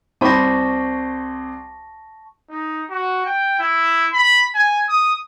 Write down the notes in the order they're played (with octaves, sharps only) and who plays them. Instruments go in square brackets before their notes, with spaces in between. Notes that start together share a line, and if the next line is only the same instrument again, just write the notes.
[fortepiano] C2 C5 B5 [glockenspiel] A5 C#6 A#6
[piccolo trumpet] D#4
F#4
G5
E4
B5
G#5
D#6